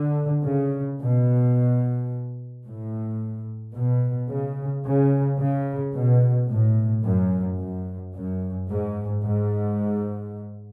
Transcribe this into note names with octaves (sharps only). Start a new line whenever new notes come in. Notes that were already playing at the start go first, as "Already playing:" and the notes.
Already playing: D3
C#3
B2
A2
B2
C#3
C#3
C#3
B2
A2
F#2
F#2
F#2
G#2
G#2